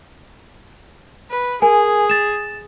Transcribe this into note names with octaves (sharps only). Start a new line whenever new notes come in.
B4
G#4 A#4 G#5
A6 E7